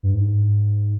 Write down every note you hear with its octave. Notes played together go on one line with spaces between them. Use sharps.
G2
G#2